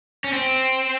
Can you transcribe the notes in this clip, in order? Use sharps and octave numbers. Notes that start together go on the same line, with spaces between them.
C#4
C4